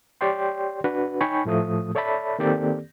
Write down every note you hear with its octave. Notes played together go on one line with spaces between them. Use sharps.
G4 C#5 D5 G5 C6
D4 F#4 B4
D#4 C#5 G5 G#5 B5 C#6
A2 F3 A3 D#6
A4 C#5 D5 E5 A5 B5
D#3 A#3 C4 G4 A4 D5